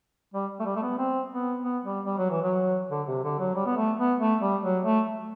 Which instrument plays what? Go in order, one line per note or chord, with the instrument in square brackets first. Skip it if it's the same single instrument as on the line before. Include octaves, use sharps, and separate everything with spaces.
[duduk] G3
A3
G3
A3
B3
C4
B3
B3
G3
G3
F#3
E3
F#3
D3
C3
D3
F#3
G3
B3
A3
B3
A3
G3
F#3
A3